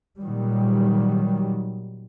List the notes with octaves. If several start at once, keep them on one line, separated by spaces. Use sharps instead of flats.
A#2 D#3 F#3 G3